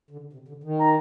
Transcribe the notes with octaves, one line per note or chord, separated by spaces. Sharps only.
D3
C3
D3
D#3
A#5